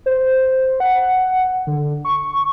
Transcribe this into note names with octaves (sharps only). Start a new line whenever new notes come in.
C5
F#5
D3
C#6